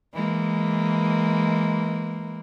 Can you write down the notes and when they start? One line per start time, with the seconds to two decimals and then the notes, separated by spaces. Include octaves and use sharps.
0.14 E3 G#3 A#3